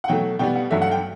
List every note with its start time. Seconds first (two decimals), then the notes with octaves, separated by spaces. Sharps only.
0.04 F#5
0.08 B2 F#3 A3 G5
0.39 B2 G3 B3 G5
0.56 F#5
0.71 G2 F#3 A3 E5
0.82 F#5
0.91 G5